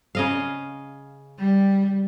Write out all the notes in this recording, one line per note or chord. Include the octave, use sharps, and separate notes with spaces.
C#3 D#5 F5
G3